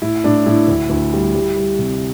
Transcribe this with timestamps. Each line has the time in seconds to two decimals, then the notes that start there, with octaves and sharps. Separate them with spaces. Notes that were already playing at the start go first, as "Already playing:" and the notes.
0.02 A2 E4
0.24 A2 D4
0.46 A2 E4
0.68 D2
0.90 D2
1.13 G3
1.35 G3
1.56 G3
1.79 C3